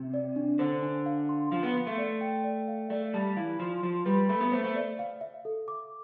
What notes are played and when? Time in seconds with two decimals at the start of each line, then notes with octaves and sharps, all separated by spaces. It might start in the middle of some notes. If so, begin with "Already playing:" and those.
Already playing: C3
0.14 D5
0.36 D4
0.59 D3 C5
0.82 D4
1.06 F5
1.29 C6
1.52 F3 F5
1.63 B3
1.75 C6
1.87 A3
1.98 D5
2.21 G5
2.44 D5
2.68 F5
2.90 A3 D5
3.14 G3 A5
3.37 E3 F5
3.59 F3 C6
3.83 F3 C6
4.06 G3 B4
4.29 A3 B5
4.40 B3
4.52 A3 C5
4.64 A3
4.75 D5
4.99 F5
5.21 E5
5.45 A4
5.68 D6